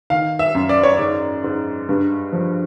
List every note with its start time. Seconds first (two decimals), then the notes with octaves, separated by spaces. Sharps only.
0.10 D#3 F5
0.39 E5
0.55 F#2
0.69 D5
0.83 C#5
0.97 G#2 D5
1.44 G#2
1.89 G2
2.33 F3